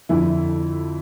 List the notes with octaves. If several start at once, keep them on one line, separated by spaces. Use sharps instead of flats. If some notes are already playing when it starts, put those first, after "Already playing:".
F2 D3 E4